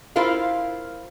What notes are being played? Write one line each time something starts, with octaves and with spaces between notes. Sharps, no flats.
E4 F4 A#4 C5 F5